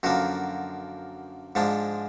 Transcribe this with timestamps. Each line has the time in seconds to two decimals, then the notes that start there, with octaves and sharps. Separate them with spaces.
0.03 F#2 D3 F3 A#3 F#4
1.55 G#2 F3 G#3 D4